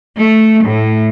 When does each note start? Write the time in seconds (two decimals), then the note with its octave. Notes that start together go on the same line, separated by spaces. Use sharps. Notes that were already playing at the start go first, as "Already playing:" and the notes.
0.16 A3
0.67 A2